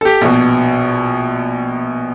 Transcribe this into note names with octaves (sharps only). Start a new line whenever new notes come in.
G4 A4
A#1 B2